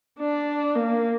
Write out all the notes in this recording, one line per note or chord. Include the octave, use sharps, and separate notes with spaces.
D4
A#3